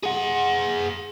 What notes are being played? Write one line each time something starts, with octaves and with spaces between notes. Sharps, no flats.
G#4 F#5